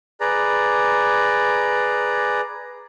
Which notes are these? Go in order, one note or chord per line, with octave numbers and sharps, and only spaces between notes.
G#4 B4 D5 A#5